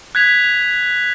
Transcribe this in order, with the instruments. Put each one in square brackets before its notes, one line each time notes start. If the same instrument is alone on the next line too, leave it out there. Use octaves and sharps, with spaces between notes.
[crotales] F#6 G#6 B6 F7